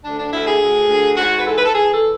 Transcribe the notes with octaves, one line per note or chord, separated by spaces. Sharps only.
D2 D4
D4
D2 E4
G#4
D2
D2
G#2 F#4
B4
E3 A4
B4
A4
E3 G#4
A4